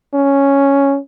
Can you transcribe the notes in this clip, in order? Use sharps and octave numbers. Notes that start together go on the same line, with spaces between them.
C#4